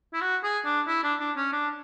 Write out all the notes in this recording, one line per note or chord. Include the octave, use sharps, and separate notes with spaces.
E4
F#4
G#4
D4
E4
D4
D4
C#4
D4